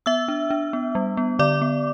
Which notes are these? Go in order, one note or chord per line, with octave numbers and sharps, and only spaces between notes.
B3 E5 E6
D4
D4
B3
G3
B3
D3 D5 D6
B3